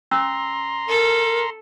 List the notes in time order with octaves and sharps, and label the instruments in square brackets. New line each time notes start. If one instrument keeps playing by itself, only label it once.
[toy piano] C#4 E6 [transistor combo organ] A#5 C6
[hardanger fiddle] A4 [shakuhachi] A#4